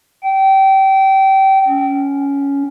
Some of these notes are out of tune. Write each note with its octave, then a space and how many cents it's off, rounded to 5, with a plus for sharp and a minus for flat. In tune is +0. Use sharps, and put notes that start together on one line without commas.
G5 -25
C#4 +10